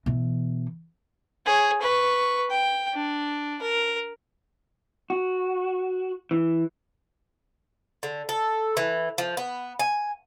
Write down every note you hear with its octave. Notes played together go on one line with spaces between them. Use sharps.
B2 E3
G#4 C#5
B4 C#6
G5
D4
A#4
F#4
E3
D3
A4
E3
F3
B3
G#5